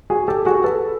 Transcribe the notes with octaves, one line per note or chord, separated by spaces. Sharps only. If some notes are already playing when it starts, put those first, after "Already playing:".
F#4 G#4
G4 A4
F#4 G#4
A4 B4